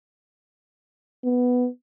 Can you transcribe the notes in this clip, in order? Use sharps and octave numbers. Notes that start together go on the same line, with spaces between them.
B3